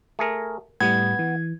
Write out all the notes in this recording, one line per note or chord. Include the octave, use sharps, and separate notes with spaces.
A3 G#4 A#4
A2 G3 B3 G#6
E3